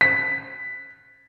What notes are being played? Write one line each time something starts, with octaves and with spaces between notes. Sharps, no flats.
B6